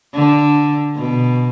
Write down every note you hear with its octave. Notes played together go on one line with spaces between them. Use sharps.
D3
B2